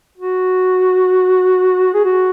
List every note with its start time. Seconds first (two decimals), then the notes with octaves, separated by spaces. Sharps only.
0.17 F#4
1.94 G#4
2.05 F#4